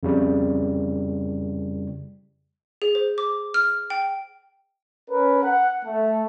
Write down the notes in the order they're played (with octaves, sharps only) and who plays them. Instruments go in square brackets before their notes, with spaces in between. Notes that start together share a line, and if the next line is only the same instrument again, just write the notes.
[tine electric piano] F2 C#3 G3
[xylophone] G#4
C5
D6
F6
G5
[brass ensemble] C#4 A#4 B4
F#5
A3